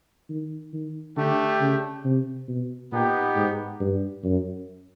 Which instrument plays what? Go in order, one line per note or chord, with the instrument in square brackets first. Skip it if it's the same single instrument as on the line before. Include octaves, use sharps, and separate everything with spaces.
[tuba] D#3
D#3
[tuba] D3 [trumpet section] A3 D4 G4
[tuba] C#3
C3
B2
[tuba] A#2 [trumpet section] B3 D#4 G4
[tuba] G#2
G2
F#2